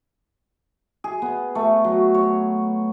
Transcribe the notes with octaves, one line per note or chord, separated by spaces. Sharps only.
G#4
B3
A3
F#3
C#5